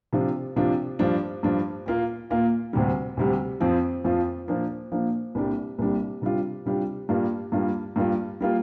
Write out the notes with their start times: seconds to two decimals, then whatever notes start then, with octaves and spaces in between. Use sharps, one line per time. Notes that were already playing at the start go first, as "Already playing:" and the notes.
0.13 C3 F3 D4 F4
0.56 C3 F3 D4 F4
0.99 G2 F3 D4
1.43 G2 F3 D4
1.86 A#2 A#3 F4
2.31 A#2 A#3 F4
2.73 D2 C3 G3
3.17 D2 C3 G3
3.60 F2 F3 C4 F4
4.04 F2 F3 C4 F4
4.48 A#2 F3 A#3 D4
4.92 A#2 F3 A#3 D4
5.35 C2 A#2 G3 D4
5.79 C2 A#2 G3 D4
6.22 C3 G3 D4 F4
6.66 C3 G3 D4 F4
7.09 G2 G3 A#3 D4 F4
7.52 G2 G3 A#3 D4 F4
7.96 G2 G3 A#3 F4
8.41 G3 A#3 F4